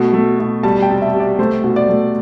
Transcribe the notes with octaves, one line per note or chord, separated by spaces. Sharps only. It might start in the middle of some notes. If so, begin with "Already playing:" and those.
Already playing: B2 A3
A3
B2
G3 A5
G5
C3
E5
C3
D5
A3 C5
B2
D5
A3